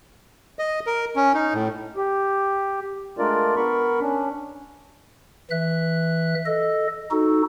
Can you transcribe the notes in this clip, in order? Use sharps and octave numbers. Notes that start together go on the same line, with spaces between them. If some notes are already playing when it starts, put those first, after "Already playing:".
D#5
A#4
C#4
D#4
A2
G4
G#3 A3 D4 F4 A#4 D5
B3 A#4 B5 C#6
C#4 D4
E3 E5 F#6
A4 D#5
D#4 F#4 A4